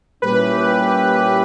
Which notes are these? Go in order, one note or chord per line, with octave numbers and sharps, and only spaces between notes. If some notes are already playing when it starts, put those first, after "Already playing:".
A#2 G3 C#4 E4 G4 B4